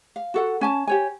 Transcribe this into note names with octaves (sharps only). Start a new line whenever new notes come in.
F5
F#4 A4 F#5
C#4 G#5 A5
G4 C#5 G#5